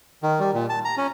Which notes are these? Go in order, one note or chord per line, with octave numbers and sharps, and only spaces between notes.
D#3
G3
A#2
A5
A#5
C#4